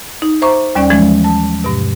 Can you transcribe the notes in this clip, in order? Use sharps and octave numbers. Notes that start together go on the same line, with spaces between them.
D#4
C5 E5 A#5 C#6 D6
D#2 G3 C#4 D5 G5 C#6
E3 F3 G#3 C#4
A5
G2 B2